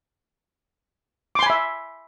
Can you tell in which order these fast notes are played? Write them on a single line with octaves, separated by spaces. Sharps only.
D6 C6 G#5 B5 E5